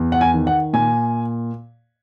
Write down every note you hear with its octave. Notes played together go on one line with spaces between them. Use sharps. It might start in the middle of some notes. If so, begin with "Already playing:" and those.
Already playing: E2
F#5
G#5
D#3
F#5
A#2 G#5